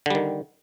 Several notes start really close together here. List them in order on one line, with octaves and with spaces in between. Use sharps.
D3 G3 D#3